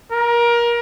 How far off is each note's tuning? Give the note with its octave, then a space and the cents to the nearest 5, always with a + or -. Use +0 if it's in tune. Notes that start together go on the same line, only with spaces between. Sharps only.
A#4 +25